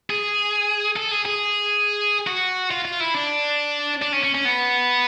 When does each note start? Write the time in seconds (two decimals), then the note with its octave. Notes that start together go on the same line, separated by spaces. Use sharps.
0.10 G#4
0.96 A4
1.11 G#4
1.25 G#4
2.27 F#4
2.71 F4
2.85 F4
3.00 E4
3.14 D4
4.02 D4
4.12 C#4
4.24 C#4
4.35 C#4
4.45 B3